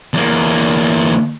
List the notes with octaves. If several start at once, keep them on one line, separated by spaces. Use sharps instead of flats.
E2 A#3